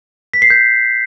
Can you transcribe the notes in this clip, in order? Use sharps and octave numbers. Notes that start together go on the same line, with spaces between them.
B6
C7
G6